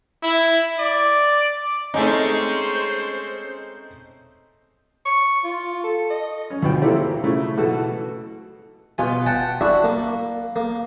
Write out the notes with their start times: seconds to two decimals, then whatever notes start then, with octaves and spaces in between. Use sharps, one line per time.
0.23 E4
0.79 D5
1.94 G#3 A3 C4 C#4 D#4 C5
5.06 C#6
5.44 F4
5.83 A4
6.10 D#5
6.50 C#4
6.62 D2 B2 F4 G5
6.81 E3 A#3 C4 E4 G4 A4
7.00 A#2
7.24 C#3 A3 E4
7.58 B2 E3 F#4 A4
8.98 B2 F4 G#5
9.26 F#5 G5 A5
9.61 D4 E4 F#4
9.84 A#3
10.56 A#3